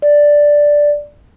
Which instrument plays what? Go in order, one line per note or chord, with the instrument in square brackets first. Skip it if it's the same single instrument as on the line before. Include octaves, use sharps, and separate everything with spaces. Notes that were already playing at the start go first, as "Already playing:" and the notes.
[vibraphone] D5